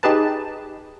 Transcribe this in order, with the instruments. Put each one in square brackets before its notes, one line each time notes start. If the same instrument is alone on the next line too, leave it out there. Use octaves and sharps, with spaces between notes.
[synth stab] D#4 G4 G#4 B4 A5